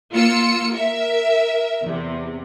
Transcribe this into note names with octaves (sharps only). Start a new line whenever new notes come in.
A#3 F4 E6 C#7
A#4 E5
E2 C3